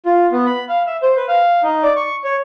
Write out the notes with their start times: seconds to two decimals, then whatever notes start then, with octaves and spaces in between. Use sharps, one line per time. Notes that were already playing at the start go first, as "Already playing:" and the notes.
0.05 F4
0.32 B3
0.46 B5
0.69 F5
0.87 E5
1.02 C5
1.17 B4
1.28 F5
1.63 D#4
1.83 D5
1.96 C#6
2.24 C#5